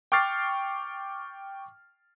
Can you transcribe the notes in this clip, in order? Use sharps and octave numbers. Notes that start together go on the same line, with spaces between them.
G5 C#6 D6 F6 A6 C7